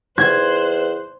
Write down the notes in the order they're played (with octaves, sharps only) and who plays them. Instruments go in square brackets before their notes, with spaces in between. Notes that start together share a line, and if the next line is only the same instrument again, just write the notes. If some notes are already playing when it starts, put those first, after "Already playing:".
[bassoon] E2 [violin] C5 F#6 [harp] G#6